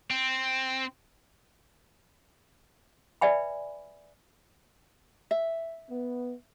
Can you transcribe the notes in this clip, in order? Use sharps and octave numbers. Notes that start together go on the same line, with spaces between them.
C4
B4 D5 E5 G#5 B5
E5
B3